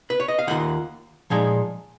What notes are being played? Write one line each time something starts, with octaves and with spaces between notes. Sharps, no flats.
B4
C#5
D#5
F5
D#2 D#3 A#3 F4 F#5
A#2 F3 G#3 D#4 G#5